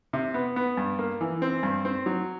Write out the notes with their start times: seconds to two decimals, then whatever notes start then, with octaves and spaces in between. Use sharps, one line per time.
0.13 C3
0.34 B3
0.56 B3
0.77 G2
0.99 A#3
1.21 E3
1.42 C4
1.63 G2
1.85 C4
2.06 F#3